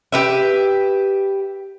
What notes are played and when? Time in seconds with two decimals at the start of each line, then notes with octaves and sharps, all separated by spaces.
0.12 G4 B4 E5